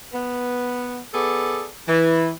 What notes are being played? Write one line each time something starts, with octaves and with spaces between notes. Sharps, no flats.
B3
B3 G#4 A4 D5
E3